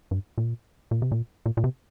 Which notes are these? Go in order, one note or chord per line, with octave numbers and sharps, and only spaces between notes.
G2
A#2
A#2
C3
A#2
A#2
A#2
C3